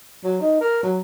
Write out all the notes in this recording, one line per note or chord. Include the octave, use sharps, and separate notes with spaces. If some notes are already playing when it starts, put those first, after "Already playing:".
F#3
D#4
A#4
F#3